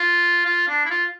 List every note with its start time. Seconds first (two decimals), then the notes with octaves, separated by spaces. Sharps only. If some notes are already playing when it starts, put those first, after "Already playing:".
Already playing: F4
0.45 F4
0.68 D4
0.85 E4
0.91 F4